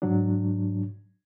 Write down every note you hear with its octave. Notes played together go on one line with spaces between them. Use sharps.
G#2 F#3 D4